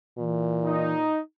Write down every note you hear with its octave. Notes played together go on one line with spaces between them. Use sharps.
A#2 E3
D#4